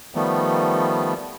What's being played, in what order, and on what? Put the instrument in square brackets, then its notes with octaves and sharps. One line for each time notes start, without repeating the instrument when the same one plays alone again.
[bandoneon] D#3 F3 G3 A3 B3